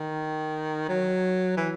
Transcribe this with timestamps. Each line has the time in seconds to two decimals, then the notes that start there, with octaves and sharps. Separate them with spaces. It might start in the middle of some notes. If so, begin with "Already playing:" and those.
Already playing: D#3
0.89 F#3
1.57 E3